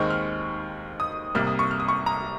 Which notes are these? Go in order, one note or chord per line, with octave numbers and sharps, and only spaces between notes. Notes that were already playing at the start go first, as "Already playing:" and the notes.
Already playing: D#2 D#3 G#3 C4 C#6
F6
D#6
C2 C3 G3 A#3 F6
D#6
C#6
F6
D#6
C#6
A#5